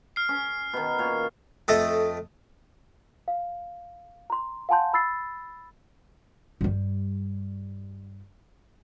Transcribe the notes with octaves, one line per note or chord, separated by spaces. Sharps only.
F6 C7
C#4
B2 D#3
A#2 C#5
F2 A3 A4 D#5
F5
A#5 C6
F5 F#5 G#5 A5 C6 G6
B5 E6 A6 C7
G2 G3